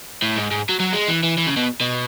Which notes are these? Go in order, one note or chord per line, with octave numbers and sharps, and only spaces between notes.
A2
G#2
G#2
F#3
F#3
G#3
E3
E3
E3
C#3
B2
B2